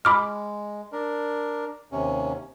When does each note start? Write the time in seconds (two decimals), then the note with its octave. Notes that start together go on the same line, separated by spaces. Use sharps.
0.05 G#3 B5 D6 F6
0.92 D4 A#4
1.92 D#2 C3 C#4